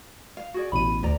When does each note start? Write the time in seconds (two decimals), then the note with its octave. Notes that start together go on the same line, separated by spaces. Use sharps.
0.37 F5
0.54 F#4 G#4 D5
0.72 A1 B2 B5 D#7
1.03 D2 G4 D5 A#5